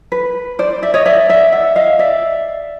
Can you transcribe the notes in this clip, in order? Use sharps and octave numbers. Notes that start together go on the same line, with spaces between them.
B4
C5 D5
D5 E5
C#5 D#5
D5 E5
D5 E5
E5 F#5
D#5 F5
D5 E5